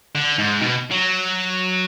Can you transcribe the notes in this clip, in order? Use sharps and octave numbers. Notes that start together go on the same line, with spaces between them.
D3
G#2
B2
F#3